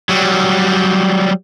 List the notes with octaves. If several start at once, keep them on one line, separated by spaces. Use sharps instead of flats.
F#3 G3